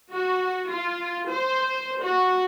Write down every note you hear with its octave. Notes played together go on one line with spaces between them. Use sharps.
F#4
F4
C5
F#4